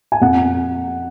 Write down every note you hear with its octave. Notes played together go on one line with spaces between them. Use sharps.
G#5
F2 F#5